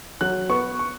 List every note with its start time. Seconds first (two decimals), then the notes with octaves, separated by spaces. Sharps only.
0.21 F#3 F#6
0.49 B3 C#6
0.79 C#6